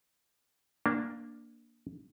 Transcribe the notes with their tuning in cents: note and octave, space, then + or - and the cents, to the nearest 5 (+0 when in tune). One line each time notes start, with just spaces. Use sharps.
A#3 +5 D4 +0